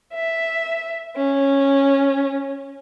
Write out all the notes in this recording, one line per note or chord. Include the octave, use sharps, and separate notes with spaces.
E5
C#4